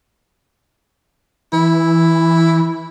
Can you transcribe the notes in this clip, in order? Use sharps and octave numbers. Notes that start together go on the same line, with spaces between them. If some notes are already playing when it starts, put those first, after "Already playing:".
E3 E4